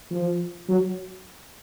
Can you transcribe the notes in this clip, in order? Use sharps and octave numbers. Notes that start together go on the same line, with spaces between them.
F3
F#3